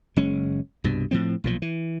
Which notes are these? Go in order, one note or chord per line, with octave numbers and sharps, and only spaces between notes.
F#1 G#3 C#4
C2 G2 B2
A2 F3 C4
B1 A#2 F3
E3